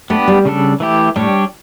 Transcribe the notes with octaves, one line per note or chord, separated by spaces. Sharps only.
A3 B3 D4 G4 B4
G3
C#3 G3 D4 A4
E3 A3 E4 G4
A2 G3 D4 G4 C#5